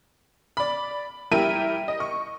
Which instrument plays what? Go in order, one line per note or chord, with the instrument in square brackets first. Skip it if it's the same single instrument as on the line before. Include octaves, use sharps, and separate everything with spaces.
[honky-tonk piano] D5 B5
G3 E4 A#4 E5 G5 D#7
D#5
C#6